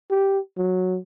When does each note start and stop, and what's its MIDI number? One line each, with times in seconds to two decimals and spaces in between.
0.11 0.39 67
0.57 0.98 54